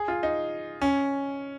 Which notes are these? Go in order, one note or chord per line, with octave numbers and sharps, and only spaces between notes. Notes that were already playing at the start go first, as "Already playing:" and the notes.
Already playing: G#4
F4
D#4
C#4